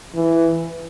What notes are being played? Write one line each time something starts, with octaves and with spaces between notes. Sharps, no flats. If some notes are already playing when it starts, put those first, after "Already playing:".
E3